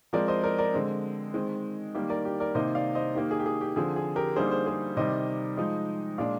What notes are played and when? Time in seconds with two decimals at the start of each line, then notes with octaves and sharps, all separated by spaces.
0.13 F3 G#3 C4 A#4 D5
0.28 C5 D#5
0.44 A#4 D5
0.58 A#4 D5
0.74 D3 G#3 C4
1.33 D#3 G#3 C4
1.95 D#3 G3 A#3 G4
2.10 A#4 D5
2.25 G4
2.40 A#4 D5
2.55 C3 D#3 A#3 D#4 C5 D#5
2.75 D5 F5
2.95 C5 D#5
3.15 D#3 A#3 D#4 G4
3.31 G#4
3.39 G4
3.46 G#4
3.61 G4
3.76 D3 F3 C4 G#4
3.96 G#4
4.16 G4 A#4
4.36 D3 G3 A#3 D#4 G#4 C5
4.51 G#4 C5
4.66 G#4 C5
4.97 C3 D#3 G3 C5 D#5
5.57 F3 G#3 D#4
6.18 A#2 G#3 D4 D5 F5